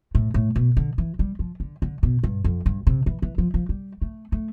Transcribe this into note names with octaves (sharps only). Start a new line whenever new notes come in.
A2
A2
B2
D3
E3
G3
F3
D3
D3
B2
G2
F2
G2
C3
E3
E3
F3
F3
G3
A3
A3